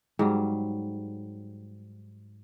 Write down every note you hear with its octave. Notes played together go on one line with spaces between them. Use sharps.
G#2 F#3 G3